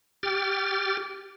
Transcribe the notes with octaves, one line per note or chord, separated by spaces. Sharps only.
G4 G5 F6 A6